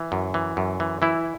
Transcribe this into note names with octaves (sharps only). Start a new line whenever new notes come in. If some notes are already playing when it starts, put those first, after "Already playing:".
Already playing: E3
F#2
E3
F#2
E3
E3 E4